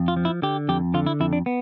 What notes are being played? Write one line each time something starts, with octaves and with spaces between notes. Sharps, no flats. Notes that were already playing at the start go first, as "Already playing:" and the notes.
Already playing: F2
F4
F3
E4
D3 G4
F2 G4
D3 F4
E4
F2 E4
D4
B3